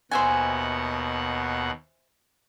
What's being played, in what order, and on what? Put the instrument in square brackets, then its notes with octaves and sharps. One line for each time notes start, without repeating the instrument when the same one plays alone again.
[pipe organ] D#2 B2 F#5 [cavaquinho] C5 E5 G#5